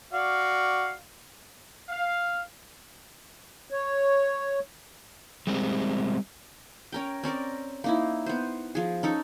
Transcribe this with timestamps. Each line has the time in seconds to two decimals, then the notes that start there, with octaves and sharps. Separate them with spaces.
0.13 F#4 D5 F5
1.89 F5
3.70 C#5
5.47 G3 G#3 C4
6.92 C#4 A#4 G5
7.24 C4 C#4 A#4 D5
7.84 A#3 D#4 E4
8.26 B3 C5
8.75 F3 G#4
9.03 C#4 D#4 A4